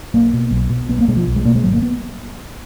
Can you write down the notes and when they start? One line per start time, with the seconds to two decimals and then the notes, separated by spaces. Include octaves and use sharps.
0.14 B1 A#3
0.33 B2
0.51 B1
0.70 B2
0.89 B1 B3
0.99 A#3
1.08 B2 G#3
1.17 F3
1.27 B1
1.36 G#3
1.45 B2 A#3
1.55 G#3
1.64 G#1 F#3
1.73 A#3
1.82 B3